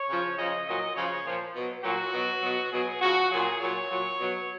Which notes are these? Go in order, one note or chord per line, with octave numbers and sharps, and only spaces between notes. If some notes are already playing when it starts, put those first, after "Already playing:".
Already playing: C#5
C#3 F3
C#3 F3 D#5
A#2 F#3 D#5
C#3 F3 C#5
A#2 F3
B2 F#3
A#2 F#3 F#4
B2 F#3
B2 F#3
B2 F#3 G#4
C#3 F3 F#4
A#2 F#3 G#4
A#2 F#3 C#5
A#2 F#3
B2 F#3